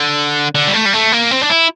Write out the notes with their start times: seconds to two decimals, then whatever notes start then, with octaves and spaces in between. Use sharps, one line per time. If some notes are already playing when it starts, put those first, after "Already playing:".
Already playing: D3
0.55 D3
0.67 G3
0.73 A3
0.85 G3
0.93 A3
1.12 A#3
1.31 C4
1.42 D4
1.50 E4